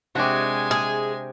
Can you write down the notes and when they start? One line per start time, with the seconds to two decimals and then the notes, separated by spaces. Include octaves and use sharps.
0.15 C3 G#3 D4 F#4 G4 C5 G#5
0.71 G#4